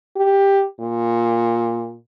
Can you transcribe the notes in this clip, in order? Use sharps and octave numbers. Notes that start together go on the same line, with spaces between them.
G4
A#2